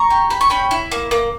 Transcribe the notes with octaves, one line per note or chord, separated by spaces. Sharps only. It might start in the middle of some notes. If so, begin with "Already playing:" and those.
Already playing: A#5 C#6
G4
G4 B5
C#6
C#4 G5 B5
E4
A#3
A#3